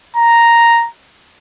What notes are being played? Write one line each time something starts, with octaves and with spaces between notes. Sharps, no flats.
A#5